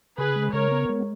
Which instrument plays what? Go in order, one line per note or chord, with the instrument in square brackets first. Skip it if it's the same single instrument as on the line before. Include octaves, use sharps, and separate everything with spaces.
[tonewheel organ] C#3 [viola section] G#4 B4
[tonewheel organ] G#3
[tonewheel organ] C#3 [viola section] A#4 C#5
[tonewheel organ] B3
G#3